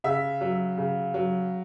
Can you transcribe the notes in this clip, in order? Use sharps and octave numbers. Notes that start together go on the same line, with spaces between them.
C#3 E5
F#3
C#3
F#3